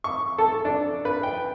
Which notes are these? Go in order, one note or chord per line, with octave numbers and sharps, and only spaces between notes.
C#6
A4
D4
B4
G5